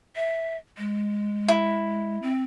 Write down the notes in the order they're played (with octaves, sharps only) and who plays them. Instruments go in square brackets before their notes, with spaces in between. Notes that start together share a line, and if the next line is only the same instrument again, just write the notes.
[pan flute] E5
G#3
[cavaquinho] E4
[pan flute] C4